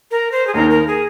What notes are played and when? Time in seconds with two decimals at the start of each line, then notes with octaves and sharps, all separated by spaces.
0.11 A#4
0.32 C5
0.47 G#4
0.54 D#2 D#3 A#3 D#4 A#4
0.70 A#4
0.87 G#4